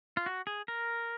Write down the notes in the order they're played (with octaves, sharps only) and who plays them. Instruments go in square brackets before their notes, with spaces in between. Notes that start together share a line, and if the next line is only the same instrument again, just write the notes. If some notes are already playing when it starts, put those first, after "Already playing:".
[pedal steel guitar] F4
F#4
G#4
A#4